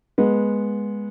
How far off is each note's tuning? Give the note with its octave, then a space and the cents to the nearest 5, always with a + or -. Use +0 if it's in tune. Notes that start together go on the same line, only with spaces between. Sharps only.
G#3 +0 B3 -20